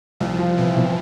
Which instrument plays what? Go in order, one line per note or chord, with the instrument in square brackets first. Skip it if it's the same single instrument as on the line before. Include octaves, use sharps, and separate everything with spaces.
[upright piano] C2 [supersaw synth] F3
[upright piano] F3
[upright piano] C3 [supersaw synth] E3
[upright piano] C3